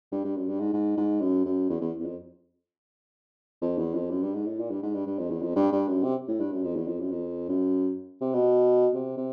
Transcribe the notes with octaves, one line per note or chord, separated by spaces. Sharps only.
G2
G2
F#2
G2
G#2
G#2
G#2
F#2
F#2
E2
E2
E2
F2
F2
E2
F2
F#2
G2
G#2
A2
A#2
G2
G#2
G2
G2
F2
E2
F2
G2
G2
F#2
C3
A2
G2
F#2
F2
E2
F2
F#2
F2
F#2
C3
B2
C3
C3